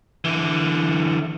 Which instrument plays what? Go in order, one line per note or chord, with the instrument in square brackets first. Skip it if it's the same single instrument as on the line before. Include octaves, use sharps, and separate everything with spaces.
[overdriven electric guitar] D3 E3